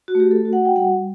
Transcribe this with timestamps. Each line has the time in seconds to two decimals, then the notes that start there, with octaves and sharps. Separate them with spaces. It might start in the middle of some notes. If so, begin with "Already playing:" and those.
0.08 F#4
0.15 A3
0.20 G4
0.31 A4
0.45 F#4
0.53 F#5
0.65 G5
0.76 G3 F#5